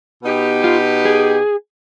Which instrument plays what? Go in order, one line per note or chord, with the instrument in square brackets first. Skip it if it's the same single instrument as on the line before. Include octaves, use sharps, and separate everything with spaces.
[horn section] B2 B3 D#4 G4
[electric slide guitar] F4
G#4